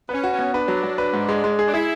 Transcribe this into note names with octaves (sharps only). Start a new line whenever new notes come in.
B3 C#4 B4
F#4
C#4
B3
D4 B4
F#3
F#3
B4
G#2
G#3
G#3
G#4
D4
E4 G#4